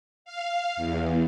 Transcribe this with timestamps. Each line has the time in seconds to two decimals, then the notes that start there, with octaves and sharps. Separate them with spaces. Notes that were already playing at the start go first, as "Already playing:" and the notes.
0.25 F5
0.76 E2